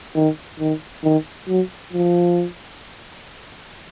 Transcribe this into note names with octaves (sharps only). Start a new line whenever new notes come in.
D#3
D#3
D#3
F#3
F3